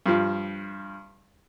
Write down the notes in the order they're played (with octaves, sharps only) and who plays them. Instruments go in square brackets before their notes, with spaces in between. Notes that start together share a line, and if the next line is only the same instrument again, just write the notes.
[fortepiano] G2 F3